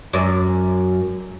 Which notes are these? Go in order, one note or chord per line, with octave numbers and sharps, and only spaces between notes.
F#2 D5